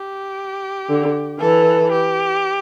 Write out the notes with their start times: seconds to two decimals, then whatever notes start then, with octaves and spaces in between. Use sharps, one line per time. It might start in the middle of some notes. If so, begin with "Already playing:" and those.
Already playing: G4
0.89 D3
1.40 E3 A4
1.92 G4